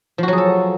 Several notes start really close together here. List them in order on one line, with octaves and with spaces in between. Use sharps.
F3 F#4 F#3 G#4 A4